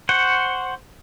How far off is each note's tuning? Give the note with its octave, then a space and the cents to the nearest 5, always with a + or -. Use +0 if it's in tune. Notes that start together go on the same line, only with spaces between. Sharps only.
C5 +0 F#5 +5 C#6 +0